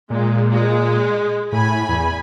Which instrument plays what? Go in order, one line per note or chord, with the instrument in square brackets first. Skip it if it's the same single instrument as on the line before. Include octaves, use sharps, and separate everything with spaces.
[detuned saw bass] A#2 [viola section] G#3
[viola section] G#3
[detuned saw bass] A2 [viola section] G#5 B5
[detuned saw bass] E2